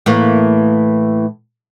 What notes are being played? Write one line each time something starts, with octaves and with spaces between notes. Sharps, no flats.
A2 E3 A#3